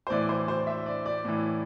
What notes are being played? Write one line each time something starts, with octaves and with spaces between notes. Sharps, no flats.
C5
A2 E3 D5
C5
C5
E5
D5
D5
A2 E3